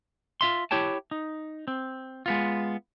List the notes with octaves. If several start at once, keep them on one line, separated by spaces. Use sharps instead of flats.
F4 E5 C6
E4 G4 C#5 G5 A5
D#4
C4
G#3 B3 F4